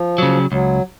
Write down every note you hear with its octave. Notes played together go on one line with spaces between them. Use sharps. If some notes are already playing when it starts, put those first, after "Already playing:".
Already playing: F3
C#3 F#3
C#2 F#3